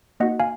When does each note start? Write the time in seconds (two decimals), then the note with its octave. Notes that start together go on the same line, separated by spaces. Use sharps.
0.20 A#3 D#4 F#4 D#5 F#5
0.40 F5 G#5